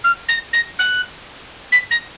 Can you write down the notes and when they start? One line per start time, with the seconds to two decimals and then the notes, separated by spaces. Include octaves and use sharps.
0.04 F6
0.28 A#6
0.53 A#6
0.79 F#6
1.72 B6
1.91 A#6